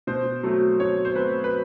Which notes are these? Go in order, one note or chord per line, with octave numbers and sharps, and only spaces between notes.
B2 C5
F#3 A3 C4
B2 C#5
C5
F#3 A3 C4 B4
B4